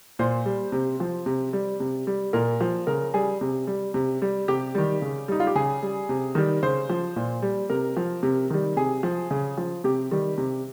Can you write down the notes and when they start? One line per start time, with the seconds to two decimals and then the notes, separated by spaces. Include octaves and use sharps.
0.19 A#2 C5
0.46 G3
0.72 C3
1.00 F3
1.26 C3
1.53 G3
1.80 C3
2.07 G3
2.33 A#2 A#4
2.61 F3
2.87 C#3 A#4
3.14 G3 G#4
3.41 C3
3.67 G3
3.94 C3
4.22 G3
4.48 C3 G4
4.75 D#3 G3
5.02 C#3
5.28 G3 D#4
5.40 F4
5.47 G4
5.55 C#3 G#4
5.83 G3
6.09 C3
6.35 D#3 G3
6.63 C#3 C5
6.90 F3
7.16 A#2
7.42 G3
7.70 C3 A#4
7.97 F3
8.23 C3
8.50 D#3 G3
8.76 C3 G#4
9.03 F3
9.31 C#3
9.58 F3
9.84 C3 G4
10.11 D#3 G3
10.38 C3